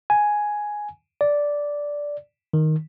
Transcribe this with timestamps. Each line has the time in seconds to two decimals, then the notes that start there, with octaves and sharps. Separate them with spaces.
0.10 G#5
1.21 D5
2.53 D#3